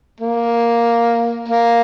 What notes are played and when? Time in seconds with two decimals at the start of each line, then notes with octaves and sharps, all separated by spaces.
0.20 A#3
1.48 A#3